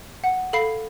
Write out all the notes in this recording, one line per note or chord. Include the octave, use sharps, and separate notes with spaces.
F#5
A4 F5 B5 C7